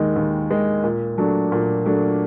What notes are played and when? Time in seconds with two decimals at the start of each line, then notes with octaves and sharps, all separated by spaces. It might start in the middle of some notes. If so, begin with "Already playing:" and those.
Already playing: D#2 D#3 G#3
0.16 D#2
0.50 D#3 G#3
0.84 A#2
1.18 F#3 A3 D4
1.52 A#2
1.86 F#3 A3 D4